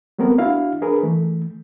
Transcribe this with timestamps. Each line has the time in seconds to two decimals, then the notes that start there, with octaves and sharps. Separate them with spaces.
0.19 G3 A3 B3 C4 A#4
0.38 D4 E4 F#4 F5
0.81 D4 G#4 A#4 B4
1.03 E3 A3